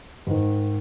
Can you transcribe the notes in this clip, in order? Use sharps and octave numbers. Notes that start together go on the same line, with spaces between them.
G#2 D#3